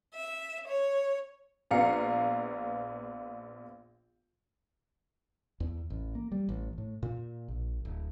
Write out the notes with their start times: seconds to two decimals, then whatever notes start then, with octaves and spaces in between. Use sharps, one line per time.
0.16 E5
0.69 C#5
1.71 A#1 B3 F5 A#5 C#7
5.60 E2
5.90 A1
6.15 A#3
6.32 G3
6.49 A1
6.78 A2
7.03 A#2
7.48 A#1
7.85 D1